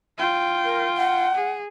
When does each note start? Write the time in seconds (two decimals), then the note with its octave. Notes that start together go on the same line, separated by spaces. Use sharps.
0.18 F4 G5
0.65 A#4
0.97 F#5
1.35 G#4